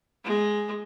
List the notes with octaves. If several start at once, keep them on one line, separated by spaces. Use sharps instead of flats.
G#3